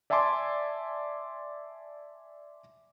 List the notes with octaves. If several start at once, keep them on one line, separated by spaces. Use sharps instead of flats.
D5 E5 G#5 A5 C6 D6